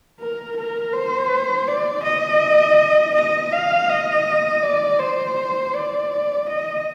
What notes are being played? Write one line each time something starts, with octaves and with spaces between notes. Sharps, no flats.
A#4
A#4
C5
D5
D#5
D#5
F5
D#5
D5
C5
D5
D#5